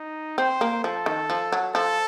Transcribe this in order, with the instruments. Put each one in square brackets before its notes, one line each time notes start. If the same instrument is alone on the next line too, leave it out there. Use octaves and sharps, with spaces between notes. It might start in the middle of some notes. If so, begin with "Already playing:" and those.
Already playing: [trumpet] D#4
[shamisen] C4 [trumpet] C5
[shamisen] A#3
[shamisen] F3 [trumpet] A4
[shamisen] D#3
F3
F#3
[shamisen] F3 [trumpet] A4